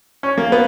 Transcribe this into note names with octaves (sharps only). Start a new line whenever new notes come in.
C#4
A#3
B3